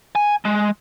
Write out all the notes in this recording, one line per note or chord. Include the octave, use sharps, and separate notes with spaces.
G#5
G#3